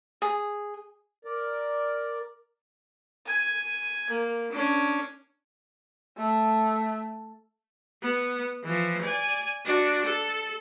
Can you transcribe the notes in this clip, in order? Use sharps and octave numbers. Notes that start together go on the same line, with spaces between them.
G#4
A#4 D5
G#5
A#3
C#4 D4
A3
B3
E3 F3
D5 G#5
D4 F#4
A4